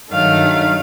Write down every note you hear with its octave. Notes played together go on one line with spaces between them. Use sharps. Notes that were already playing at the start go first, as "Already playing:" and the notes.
G2 D#3 F#3 A3 F5